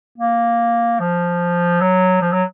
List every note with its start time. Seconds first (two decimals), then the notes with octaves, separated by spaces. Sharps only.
0.18 A#3
1.00 F3
1.81 F#3
2.22 F3
2.33 F#3